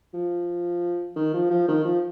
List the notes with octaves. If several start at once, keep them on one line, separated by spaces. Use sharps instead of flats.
F3
D#3
F3
F3
D#3
F3